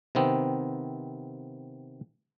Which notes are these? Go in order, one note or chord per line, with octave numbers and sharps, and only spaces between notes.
C3 D#3 B3 C4